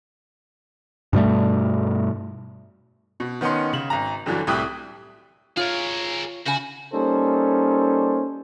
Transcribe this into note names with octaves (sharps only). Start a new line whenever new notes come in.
G2 B2 G3 A3
B2
D#3 B3 C#4 D#4 C6
C#3 F#7
G#1 A#5
G1 D3 E3 F#3
C2 A2 E4 G4 D#6 F#6
F4 G#4 A#4 C#5
C#3 F#4 G#5
G3 A#3 C#4 D#4 A4 C5